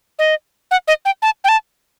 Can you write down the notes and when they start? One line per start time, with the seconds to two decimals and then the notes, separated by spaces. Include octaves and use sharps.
0.19 D#5
0.71 F#5
0.88 D#5
1.05 G5
1.22 A5
1.44 G5
1.49 A5